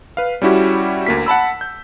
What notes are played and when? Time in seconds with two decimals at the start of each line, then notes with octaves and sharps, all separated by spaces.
0.17 B4 F5
0.42 G3 C#4 E4 F#4 G4
1.06 D2 A#3 B6
1.26 F#5 A5 B5 E6
1.61 G6